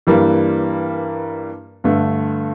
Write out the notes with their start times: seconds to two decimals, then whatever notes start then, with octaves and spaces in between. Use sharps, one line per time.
0.07 G2 E3 G3 A#3
1.84 G2 D3 A3